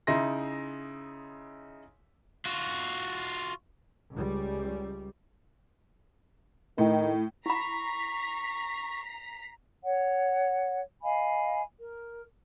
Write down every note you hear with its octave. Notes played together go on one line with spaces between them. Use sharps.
C#3 D#4 E4 C6 A#6
F4 F#4
C#2 G3
A2 D#3
E4 A#5 B5 C#6 B6 C7
C#5 F#5
D#5 F5 G#5 B5
A#4